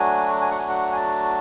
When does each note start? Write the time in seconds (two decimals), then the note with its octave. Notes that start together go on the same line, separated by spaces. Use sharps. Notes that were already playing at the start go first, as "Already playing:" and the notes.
Already playing: F#3 A3 D4 F#4 G#5
0.41 G#5
0.51 F#5
0.58 G#5
0.69 F#5
0.92 G#5
0.96 A5